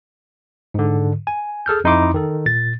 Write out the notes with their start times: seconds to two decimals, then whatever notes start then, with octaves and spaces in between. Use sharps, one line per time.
0.74 G#2 D3
1.27 G#5
1.66 G#4 A4 F6 G6
1.84 F2 D#4 E4 C6 D6
2.14 D#3 A4
2.46 A#2 A6